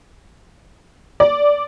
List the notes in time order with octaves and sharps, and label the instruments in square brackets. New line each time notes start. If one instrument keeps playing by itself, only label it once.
[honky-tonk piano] D5